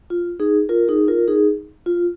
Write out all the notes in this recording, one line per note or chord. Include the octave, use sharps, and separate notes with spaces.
F4
D#4 G#4
F4 A#4
D#4 G#4
F4 A#4
D#4 G#4
F4